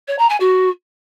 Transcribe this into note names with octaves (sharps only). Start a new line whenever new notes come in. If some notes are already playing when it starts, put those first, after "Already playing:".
C#5
A#5
G#5
F#4